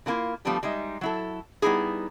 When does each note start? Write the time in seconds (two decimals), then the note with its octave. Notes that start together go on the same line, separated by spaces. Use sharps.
0.06 C#3 F3 A#3 E4 F4
0.45 F3 G3 A3 B3 D4 G4
0.63 G3 G#3 D#4 E5
1.01 F#3 E4 A4
1.62 G3 B3 D#4 E4 G#4